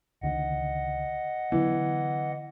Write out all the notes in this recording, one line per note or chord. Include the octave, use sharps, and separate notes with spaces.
C#2 D3 D#3 D#5 F#5
D3 E3 F#3 B3